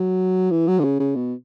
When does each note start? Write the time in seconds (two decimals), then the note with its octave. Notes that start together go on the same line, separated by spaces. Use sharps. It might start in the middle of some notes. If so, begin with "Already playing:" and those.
Already playing: F#3
0.51 E3
0.68 F#3
0.80 D3
0.84 C#3
1.00 C#3
1.16 B2